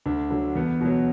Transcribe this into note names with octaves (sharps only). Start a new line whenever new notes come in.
D2 D4
D3 F#3
E2 B3
B2 F#3